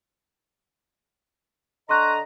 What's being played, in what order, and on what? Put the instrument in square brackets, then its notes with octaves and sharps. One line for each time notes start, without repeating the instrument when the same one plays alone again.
[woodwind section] D3 D#5 A#5 [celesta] C6 C#6 F#6